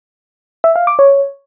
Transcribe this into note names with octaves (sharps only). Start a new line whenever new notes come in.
E5
F5
D6
C#5